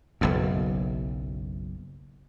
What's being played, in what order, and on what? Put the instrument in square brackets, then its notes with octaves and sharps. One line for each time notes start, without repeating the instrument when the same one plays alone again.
[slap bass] F#1 B1 F#2